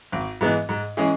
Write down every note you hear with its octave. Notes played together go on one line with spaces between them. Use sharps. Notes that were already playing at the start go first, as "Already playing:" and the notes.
G#1
G#2 E3 G#3 B3
G#2
E3 G#3 C#4 G#4